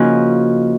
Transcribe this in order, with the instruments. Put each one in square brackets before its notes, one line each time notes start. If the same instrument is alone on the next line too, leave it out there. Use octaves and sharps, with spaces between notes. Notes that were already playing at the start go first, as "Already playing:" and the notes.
Already playing: [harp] C#3 F3 A#3 C#4 D#4 F#4